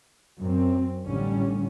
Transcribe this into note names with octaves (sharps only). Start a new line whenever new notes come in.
F#2 C4
A1 D3 G3 C#4